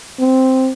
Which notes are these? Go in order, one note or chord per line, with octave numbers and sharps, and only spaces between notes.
C4